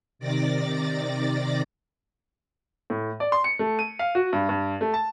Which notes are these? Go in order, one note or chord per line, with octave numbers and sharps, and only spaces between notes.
C3 D#3 D5 D6 A6 A#6
A2
D5
C6
C#7
A3
D#7
F5
F#4
G2
G2
A3
A5